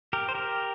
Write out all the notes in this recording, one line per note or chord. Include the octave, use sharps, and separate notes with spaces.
G4 A#4
C5
G4 A#4